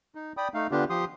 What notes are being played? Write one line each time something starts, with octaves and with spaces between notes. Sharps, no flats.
D#4
D5 G5 B5 D#6
A3 D#4 F5
D3 B3 D4 F4 G4
F3 G4 C6 D#6